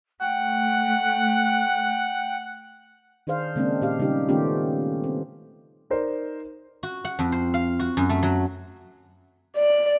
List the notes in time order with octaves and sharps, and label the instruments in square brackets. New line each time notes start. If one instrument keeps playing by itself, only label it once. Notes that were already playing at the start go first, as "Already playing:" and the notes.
[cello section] A3 [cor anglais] F#5 [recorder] G5
[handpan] D#3 D4 G#4 C5 F5
C#3 G#3 A#3 C4 D4
A#2 G4 F5
C#3 G3 D#4 G4
D#3 A3 B3 C#4 F4 G4
C4
[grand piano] D#4 A#4 C5 D5
[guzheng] F#4
F#5
F2
C5
F5
F#4
F#2
A3
F#3
[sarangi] D5